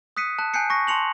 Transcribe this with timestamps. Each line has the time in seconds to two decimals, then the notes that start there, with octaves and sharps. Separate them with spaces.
0.17 D#6 F#6 B6 C#7 D#7
0.39 A5 F#6
0.54 G#5 A5 F#6 G6 C7 C#7
0.70 C#6 A#6 C7
0.87 A5 C6 C#7 F7 F#7